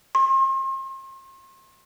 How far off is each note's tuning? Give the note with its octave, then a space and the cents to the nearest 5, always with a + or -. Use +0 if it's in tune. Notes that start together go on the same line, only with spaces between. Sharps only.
C6 +40